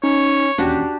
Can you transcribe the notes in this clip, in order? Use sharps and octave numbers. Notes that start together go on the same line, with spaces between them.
C#4 D#4 C#5
E1 D#2 C#4 D4 F#4 G4